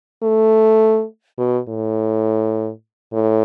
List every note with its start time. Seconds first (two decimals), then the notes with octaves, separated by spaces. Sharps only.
0.23 A3
1.39 B2
1.68 A2
3.14 A2